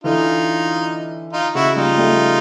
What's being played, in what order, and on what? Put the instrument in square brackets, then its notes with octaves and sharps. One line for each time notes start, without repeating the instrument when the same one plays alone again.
[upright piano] D3 E3 [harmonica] D#4 F4
[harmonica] D#4 F4
[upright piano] C#3 [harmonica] E4 F#4
[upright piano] F3 G3 [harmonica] D#4 F4
[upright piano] G3 A3